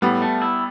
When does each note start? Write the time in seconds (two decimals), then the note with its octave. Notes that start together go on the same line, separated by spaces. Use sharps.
0.02 A2 G3 B3
0.22 A3
0.42 E4